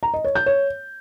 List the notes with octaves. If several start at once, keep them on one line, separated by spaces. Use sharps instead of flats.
A#5
D#5
C#5
G6
C#5